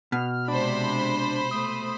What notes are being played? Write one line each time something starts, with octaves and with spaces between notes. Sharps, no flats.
B2 F6
C3 G#3 D4 C5 B5
A3 D#6